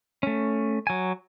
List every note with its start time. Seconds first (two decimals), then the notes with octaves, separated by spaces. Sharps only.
0.23 A3 C#4
0.87 F#3 G#5